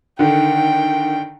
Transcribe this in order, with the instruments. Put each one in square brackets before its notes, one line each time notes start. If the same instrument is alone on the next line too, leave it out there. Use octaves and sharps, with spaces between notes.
[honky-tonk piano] D3 D#3 [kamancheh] G5